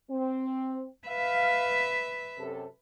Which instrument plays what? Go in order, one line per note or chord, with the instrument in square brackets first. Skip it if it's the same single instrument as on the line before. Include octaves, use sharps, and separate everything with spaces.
[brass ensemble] C4
[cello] B4 E5 [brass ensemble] F5
[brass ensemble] F#2 C3 A4